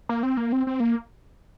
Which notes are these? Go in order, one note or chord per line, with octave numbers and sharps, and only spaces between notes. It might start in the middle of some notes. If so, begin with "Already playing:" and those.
A#3
C4
A#3
C4
C4
A#3